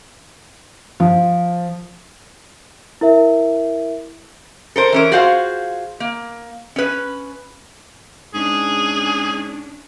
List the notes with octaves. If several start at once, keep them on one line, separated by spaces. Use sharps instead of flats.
F3
E4 A#4 E5
A4 A#4 C5
E3 C#4 A#4
F4 F#4 G#4 C5 F5
A#3
C#4 B4
G#2 C#4 D4 G#4